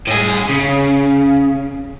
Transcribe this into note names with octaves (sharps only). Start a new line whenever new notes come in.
A2 G#4
C#3